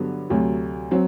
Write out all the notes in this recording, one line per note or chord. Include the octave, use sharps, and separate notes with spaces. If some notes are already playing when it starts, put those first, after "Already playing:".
Already playing: G2 D3 F#3 B3
D2 C3 F#3
F#3 C4